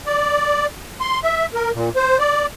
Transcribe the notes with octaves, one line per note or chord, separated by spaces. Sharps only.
D5
C6
E5
A#4
A#2
C5
D5